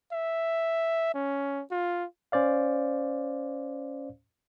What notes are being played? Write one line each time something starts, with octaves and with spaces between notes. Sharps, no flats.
E5
C#4
F4
C#4 C5 D5 F5